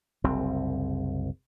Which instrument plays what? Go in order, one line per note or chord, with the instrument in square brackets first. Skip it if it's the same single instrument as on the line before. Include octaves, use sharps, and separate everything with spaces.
[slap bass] F#1 C2 C4